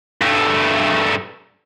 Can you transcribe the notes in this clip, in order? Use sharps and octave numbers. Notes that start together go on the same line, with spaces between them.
G2 A3